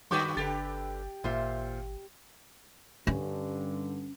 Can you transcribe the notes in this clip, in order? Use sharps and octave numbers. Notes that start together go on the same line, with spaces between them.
F#2 D#3 F#4 B4 C#6 D6 G6
G1 D3 G4 A4 B4 A6
G#1 A#2 F4 C5 E5
G2 D3 C#4